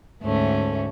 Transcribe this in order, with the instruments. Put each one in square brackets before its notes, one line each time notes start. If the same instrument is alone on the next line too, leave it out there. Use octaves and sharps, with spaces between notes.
[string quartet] D2 G#2 A3 C#4